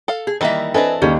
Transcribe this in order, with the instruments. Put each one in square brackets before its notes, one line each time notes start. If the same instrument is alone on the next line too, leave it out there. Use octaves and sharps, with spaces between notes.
[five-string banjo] A4 F5
[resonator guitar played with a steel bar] G#4
[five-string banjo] D#3 G3 A#3 [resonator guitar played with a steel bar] E3 A#4 E5 [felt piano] D#5
[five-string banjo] C4 D4 A4 [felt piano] B4 D#5 G#5
[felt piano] D#2 D#4 G4 [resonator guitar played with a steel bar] G3 C#4